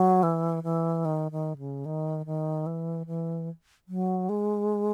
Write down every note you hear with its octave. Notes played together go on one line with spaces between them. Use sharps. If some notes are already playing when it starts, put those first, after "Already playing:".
Already playing: F#3
E3
E3
D#3
D#3
C#3
D#3
D#3
E3
E3
F#3
G#3